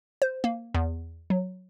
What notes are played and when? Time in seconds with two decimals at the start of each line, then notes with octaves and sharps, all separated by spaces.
0.22 C5
0.44 A#3
0.74 E2
1.30 F#3